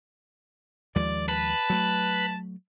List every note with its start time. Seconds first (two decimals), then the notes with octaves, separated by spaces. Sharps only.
0.96 D#2 F3 G#3 D5
1.28 B4 A5
1.70 F#3 A3